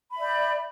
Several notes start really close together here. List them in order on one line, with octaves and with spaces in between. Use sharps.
B5 E5 D5 G6